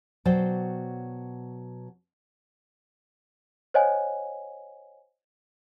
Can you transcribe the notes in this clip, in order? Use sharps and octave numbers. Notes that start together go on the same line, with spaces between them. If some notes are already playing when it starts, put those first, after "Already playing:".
B2 F#3 C5 D5 G5
C5 C#5 D#5 F#5 G#5